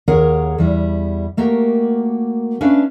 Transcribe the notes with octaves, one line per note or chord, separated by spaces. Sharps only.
D#2 G#4 A#4 C#5 F#5
E2 G3 E4
A3 A#3 F#4 G4 A#4
C#4 D4 B4 E5 F5